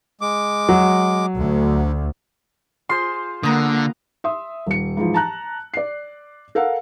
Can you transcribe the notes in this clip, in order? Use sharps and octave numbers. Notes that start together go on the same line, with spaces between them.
G#3 D6
F#3
D2 D3
F4 G#4 C5 C6
D3 A#3 B3 A#5 D#6
E5 C6 D#6
D#1 C#7
G#2 E3 F3
A5 A#5 F#6
D5 C7
A4 A#4 F5 F#5